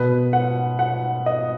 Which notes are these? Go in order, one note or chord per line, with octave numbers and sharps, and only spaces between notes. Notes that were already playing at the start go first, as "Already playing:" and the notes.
Already playing: B2 B4
F#5
F#5
D#5